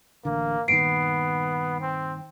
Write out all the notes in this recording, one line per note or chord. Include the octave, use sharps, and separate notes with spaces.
A1 D3 A#3
G2 A#2 D#3 B3 C7 D7
C4